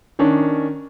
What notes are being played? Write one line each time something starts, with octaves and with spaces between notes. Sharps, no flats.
D#3 C#4 D4